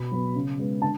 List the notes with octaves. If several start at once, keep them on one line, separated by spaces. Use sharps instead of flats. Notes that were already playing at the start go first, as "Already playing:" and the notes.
Already playing: B2 B5
F#3 B3
C#3
G#3 B3
D3 A5